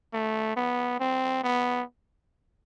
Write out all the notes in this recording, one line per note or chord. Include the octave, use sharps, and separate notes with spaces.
A3
B3
C4
B3